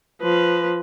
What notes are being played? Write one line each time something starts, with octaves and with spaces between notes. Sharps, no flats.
F3 B4